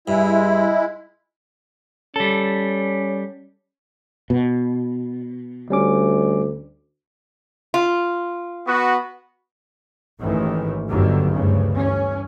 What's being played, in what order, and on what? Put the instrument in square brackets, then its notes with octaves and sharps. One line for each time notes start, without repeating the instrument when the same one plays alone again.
[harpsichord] G2 [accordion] G#3 E4
[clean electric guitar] G3 A4 [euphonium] C#4
[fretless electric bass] B2
[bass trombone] D2 [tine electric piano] G3 C#4 D6
[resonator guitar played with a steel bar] F4
[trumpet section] B3 F#4
[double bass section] A1 G#2 D#3 E3
G1 D2 G2 D3 D#3 F#3
D2 G2 C#3
E3 C#4